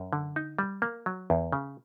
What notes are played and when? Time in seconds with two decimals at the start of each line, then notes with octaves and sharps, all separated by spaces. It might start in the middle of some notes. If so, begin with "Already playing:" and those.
Already playing: F#2
0.13 D3
0.36 D#4
0.59 G3
0.82 A#3
1.06 F#3
1.30 E2
1.52 C#3